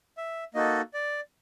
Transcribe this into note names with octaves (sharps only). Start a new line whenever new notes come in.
E5
A#3 D#4 F#4 A4 D#5
D5